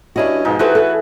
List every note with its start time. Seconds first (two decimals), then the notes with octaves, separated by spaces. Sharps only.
0.16 G2 C#4 D4 E4 F#4 D#5
0.45 G#2 B2 F3 D#4 G#4
0.59 E3 F#4 G4 A4 B4 C5
0.75 A4